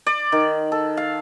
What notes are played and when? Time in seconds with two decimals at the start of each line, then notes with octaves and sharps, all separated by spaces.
0.06 D5
0.32 D#3
0.72 A4
0.97 F5